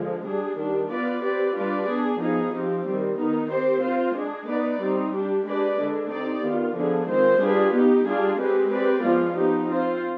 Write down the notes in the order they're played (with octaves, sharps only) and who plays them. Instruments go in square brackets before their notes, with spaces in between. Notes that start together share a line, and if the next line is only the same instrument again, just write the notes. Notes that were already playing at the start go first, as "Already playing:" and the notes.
Already playing: [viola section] D3 F3 G#3
G3 D4 G#4
D#3 G3 D4
B3 F4 B4 D5
C4 G4 B4 D5
G3 D4 F4 B4 D5
B3 D4 G#4
F3 B3 D#4 G#4
F3 C4 G4
D#3 G3 C4
D#3 B3 D#4
C4 G4 C5
C4 F4 C5
G#3 D4 G#4
B3 D#4 B4 D5
G3 C4 D#4
G3 D4 G4
G#3 D4 G4 B4 D5
D3 G#3 D4
C4 D#4 G4 D5
D#3 B3 F4
D3 F3 B3 D4 G#4
D#3 G#3 C4 F4 C5
G3 D4 F4 G#4 B4
B3 D#4 G4
G3 D4 F4 G#4
G#3 C4 G4 B4
C4 G4 B4 D5
F3 G#3 B3 F4
F3 B3 D#4 G4
C4 F4 C5